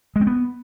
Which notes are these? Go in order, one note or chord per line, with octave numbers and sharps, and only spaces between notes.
G#3
C4
B3